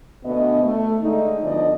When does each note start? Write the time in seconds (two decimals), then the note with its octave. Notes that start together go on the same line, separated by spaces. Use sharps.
0.24 D2 B2 B3 D4 D#5
0.63 A3
1.01 D3 G#3 A3 D#4
1.43 B2 D3 F3 D#4 D5 D#5